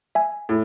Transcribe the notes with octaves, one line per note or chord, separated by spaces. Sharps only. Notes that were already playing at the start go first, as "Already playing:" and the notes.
E5 G#5
A2